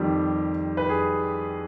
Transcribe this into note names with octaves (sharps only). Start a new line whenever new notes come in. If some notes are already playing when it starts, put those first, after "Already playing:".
Already playing: F2 D#3 G3 G4
B4
G#4